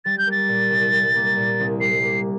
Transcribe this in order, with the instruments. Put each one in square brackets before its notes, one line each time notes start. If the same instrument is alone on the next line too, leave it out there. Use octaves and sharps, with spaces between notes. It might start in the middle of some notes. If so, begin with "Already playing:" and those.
[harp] G3 [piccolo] A6
[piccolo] G6
[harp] A#3
[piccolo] A6
[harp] A#2
C2
G3
A#3
A#2
C2
[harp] G3 [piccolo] C7
[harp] A#3